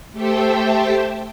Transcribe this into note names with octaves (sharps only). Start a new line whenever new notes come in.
A3 G4 A4 C5 E5 G5